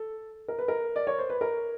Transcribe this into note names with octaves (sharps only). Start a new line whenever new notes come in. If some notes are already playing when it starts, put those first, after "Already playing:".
Already playing: A4
A#4
B4
A#4
D5
C#5
C5
B4
A#4